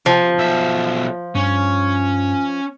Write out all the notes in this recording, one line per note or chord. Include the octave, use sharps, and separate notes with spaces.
C3 F3
B1 E5
G2 C#4